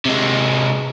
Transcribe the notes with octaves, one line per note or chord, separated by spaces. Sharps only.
C3 G#3